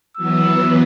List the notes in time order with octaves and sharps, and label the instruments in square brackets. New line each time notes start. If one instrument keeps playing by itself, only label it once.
[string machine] E3 F#3 B3 [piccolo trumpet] E6